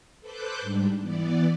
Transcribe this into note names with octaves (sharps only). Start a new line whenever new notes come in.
A4 B4 C5 D6 F#6 G6
G#2 G3 D4
E3 B3 D5